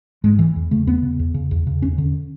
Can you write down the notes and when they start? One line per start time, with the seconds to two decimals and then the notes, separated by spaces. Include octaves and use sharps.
0.24 G#2 G#3
0.39 E3
0.56 E2
0.71 C#3 A3
0.87 E2 B3
1.02 C#3
1.19 E2
1.34 C#3
1.51 E2
1.67 C#3
1.82 E2 C#4
1.98 D3